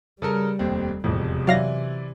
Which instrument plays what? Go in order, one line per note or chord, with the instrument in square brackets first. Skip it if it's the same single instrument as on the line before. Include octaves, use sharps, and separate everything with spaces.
[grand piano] C#3 A4 A#4 [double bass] G3
[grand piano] F1 D#2 C4
[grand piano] E1 F2 [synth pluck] A2 [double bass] C3
[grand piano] E3 E4 D5 [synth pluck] F#3 F5 A#6